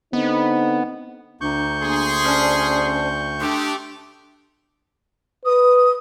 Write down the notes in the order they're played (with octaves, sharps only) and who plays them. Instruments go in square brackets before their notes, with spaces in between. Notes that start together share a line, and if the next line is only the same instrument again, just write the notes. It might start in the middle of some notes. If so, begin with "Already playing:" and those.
[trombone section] D3 C4 D#4 [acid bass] B3
[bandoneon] D2 C#6 G6 [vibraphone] D4 A#5
[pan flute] A#3 [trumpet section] G#4 C6
[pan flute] C#4 [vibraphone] C5 D5 A5
[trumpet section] A3 G4 [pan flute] D4 [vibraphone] C6 D#6
[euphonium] B4 [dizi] D#6